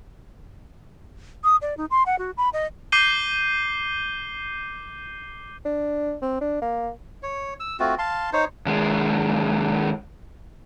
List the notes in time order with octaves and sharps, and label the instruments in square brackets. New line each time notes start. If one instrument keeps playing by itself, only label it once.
[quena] D#6
D5
D#4
C6
F#5
F#4
B5
D#5
[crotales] D6 G6 C7 D#7 G7
[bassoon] D4
C4
D4
A#3
[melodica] C#5
E6
A3 C4 F4 F#4
F5 A5 C6
D#4 C5 C#5
[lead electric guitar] D#2 G#3